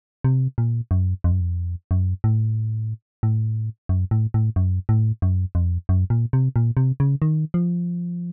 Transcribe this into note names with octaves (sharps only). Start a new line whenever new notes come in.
C3
A#2
F#2
F2
F#2
F2
F#2
A2
A2
F#2
A2
A2
F#2
A2
F#2
F2
F#2
A#2
C3
A#2
C3
C#3
D#3
F3